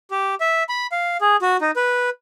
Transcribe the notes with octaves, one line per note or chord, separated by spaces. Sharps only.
G4
E5
B5
F5
G#4
F#4
D#4
B4